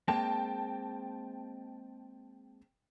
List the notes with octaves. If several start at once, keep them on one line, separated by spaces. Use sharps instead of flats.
G#3 A#3 C4 G5 A5